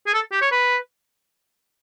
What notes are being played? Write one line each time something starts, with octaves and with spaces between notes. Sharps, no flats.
G#4
A4
G4
C#5
B4